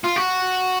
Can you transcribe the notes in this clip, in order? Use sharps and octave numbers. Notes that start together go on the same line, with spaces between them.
F4
F#4